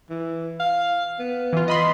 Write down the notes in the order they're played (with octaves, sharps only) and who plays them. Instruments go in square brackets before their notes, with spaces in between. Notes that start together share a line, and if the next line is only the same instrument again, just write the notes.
[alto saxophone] E3
F5
B3
[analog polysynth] E3 F4
D#5 B5 C6